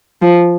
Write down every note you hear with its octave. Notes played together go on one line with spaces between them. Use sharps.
F3